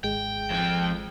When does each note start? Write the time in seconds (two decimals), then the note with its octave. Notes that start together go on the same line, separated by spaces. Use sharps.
0.04 G#1 G#3 G5
0.50 F2 F3